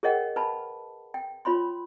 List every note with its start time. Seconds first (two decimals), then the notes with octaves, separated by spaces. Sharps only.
0.03 G#4 A#4 C#5 D#5 F#5 G5
0.36 B4 A5 B5
1.14 G5
1.45 F4 C#5 B5 C6